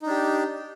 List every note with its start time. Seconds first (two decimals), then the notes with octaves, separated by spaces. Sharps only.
0.02 D#4
0.06 D4
0.10 G4